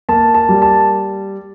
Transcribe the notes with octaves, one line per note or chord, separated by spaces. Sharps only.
A#3 A5
A5
G3
A5